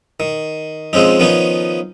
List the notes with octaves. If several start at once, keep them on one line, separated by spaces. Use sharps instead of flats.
D#3
F3 G#3 C4 C#4 D#4
D#3 F3 B3 C#4 D#4